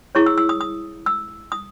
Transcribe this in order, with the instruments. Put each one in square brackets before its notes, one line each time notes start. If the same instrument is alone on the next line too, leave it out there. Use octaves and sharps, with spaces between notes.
[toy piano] E4 G#4 C#5 C#6
E6
E6
D#6
D#6
E6
D#6